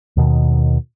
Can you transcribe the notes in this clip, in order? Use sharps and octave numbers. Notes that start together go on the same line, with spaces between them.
D#2 B2 D#3